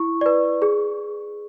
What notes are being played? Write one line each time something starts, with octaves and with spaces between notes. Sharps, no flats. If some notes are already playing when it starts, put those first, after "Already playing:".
Already playing: E4 C#6
B4 D5
G#4